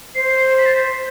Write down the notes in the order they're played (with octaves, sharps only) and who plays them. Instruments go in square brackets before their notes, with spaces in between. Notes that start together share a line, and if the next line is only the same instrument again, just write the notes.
[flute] C5 [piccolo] C7
[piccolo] B6
A6
B6